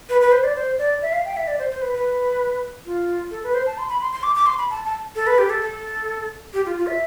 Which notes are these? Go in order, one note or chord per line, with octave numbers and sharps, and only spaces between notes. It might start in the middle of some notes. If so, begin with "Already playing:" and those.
B4
B4
C5
D5
C5
D5
E5
F5
G5
E5
D5
C5
C5
B4
B4
F4
A4
B4
C5
A5
C6
B5
C6
C6
D6
D6
C6
B5
A5
A5
A4
B4
G4
A4
A4
G4
F4
F4
E5